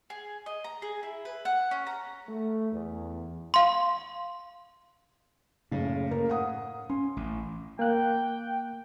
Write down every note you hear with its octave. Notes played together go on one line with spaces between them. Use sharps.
G#4
D#5
A#5
G#4
E4
B4
F#5
C#4
A#5
A3
E2
F5 C6
F#1 A2 C#3
C#3 A#3 A#4
F5 F#5 D#6
C#4 C6
A1
A#3 G5 F#6